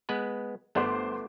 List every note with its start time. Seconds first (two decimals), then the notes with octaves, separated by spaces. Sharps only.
0.09 G#3 B3 B4
0.75 G1 A3 B3 C5 D6